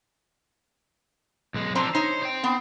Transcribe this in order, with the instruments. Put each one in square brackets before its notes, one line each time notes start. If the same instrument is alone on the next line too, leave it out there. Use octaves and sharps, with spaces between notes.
[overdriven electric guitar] B1 G#3
[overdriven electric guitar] F3 D4 [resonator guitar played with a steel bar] C4 C5 A#5
[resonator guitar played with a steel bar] D#4 C#5 D#5 [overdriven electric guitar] C5
[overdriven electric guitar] C5 G5
[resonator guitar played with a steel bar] B3 C4